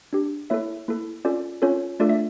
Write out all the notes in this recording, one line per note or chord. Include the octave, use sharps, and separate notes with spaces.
D4 G4
A#3 E4 A4 C#5 E5
A#3 E4 A4
C#4 F4 A4 D5
C#4 F4 A4 C#5
A3 D4 F4 A4 D5
E5